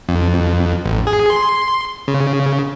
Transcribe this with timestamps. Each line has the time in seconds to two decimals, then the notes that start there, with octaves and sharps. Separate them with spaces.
0.09 F2
0.86 A1
1.07 G#4
1.30 C6
2.08 C#3